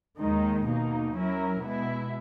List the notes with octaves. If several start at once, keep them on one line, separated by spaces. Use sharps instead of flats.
D#2 D#3 G#3 D#4
B2 A#3 D#4
F#3 C#4 E4 A#4
B2 G#3 B3 E4